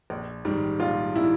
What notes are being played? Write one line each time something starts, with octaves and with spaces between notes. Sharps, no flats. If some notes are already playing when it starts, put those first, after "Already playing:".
A#1
G#2 D#3 G3
A#1 F4
D#3 G3 E4